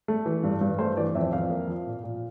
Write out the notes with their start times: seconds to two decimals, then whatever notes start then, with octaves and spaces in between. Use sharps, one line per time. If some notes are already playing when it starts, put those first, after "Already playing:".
0.08 A3
0.26 E3
0.43 G2
0.61 G2
0.79 A3 C5
0.97 E3 D5
1.15 F2 E5
1.33 F2 F5
1.50 A#3
1.68 F3
1.87 A#2
2.04 A#2